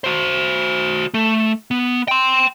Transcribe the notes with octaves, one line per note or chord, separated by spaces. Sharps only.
F#4 C5
A3
B3
G5 C6